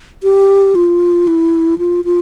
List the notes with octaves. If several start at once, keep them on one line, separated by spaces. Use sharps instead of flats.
G4
F4
E4
F4
F4